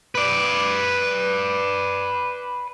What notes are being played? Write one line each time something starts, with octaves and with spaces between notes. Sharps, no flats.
B4 D5